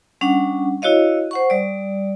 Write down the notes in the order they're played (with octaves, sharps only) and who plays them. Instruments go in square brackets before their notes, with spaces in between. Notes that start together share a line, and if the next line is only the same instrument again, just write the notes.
[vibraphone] G3 C#4 D4 F#5
E4 F#4 C#5 D#5 F5
C5 F#5 C#6
G3 D5